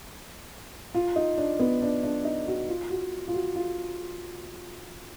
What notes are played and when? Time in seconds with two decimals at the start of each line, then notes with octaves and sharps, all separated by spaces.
0.94 F4
1.16 D#4
1.38 D4
1.59 B3
1.82 D4
2.03 D4
2.25 D#4
2.47 F#4
2.69 F4
2.90 F#4
3.28 F4
3.34 F#4
3.56 F4